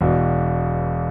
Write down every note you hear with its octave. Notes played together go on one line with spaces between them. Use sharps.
E1 E2 B2